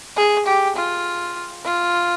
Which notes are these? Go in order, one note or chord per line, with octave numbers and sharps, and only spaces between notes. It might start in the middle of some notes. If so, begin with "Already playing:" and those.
G#4
G4
F4
F4